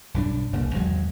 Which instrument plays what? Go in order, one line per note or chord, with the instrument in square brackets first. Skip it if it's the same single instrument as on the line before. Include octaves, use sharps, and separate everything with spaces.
[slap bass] B1 G2 E3 D4
F1 C2 C#3 A#3
G#1 E2 F#3 G#3